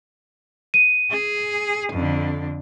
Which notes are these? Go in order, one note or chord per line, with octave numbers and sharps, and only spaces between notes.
D#7
G#4
F2 D3